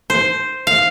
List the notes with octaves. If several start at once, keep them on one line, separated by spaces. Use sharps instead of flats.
C5
F5